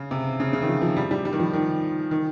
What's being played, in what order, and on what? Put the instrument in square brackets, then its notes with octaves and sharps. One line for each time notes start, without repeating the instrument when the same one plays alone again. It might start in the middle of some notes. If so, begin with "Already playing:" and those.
Already playing: [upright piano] C#3
C3
C#3
C#3
D#3
F3
F3
G3
G3
G3
D#3
F3
D#3
D#3